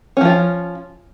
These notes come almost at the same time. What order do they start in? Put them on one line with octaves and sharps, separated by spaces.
C#4 F3 F4